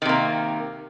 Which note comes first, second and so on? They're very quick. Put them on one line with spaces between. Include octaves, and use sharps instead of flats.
D#3 C3 A#3